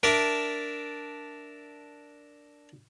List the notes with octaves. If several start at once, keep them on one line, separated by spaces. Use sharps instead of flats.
D4 A#4 D5 E5 A5